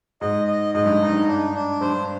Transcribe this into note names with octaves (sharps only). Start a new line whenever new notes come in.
G#2 D#5
D#5
G#2 D#5
G2
D#4
G2
D4
D4
G2 C5